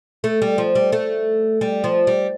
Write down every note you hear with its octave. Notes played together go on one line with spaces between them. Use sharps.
A3
G3
F3
G3
A3
G3
F3
G3